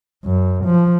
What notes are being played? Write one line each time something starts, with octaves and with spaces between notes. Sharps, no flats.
F#2
F3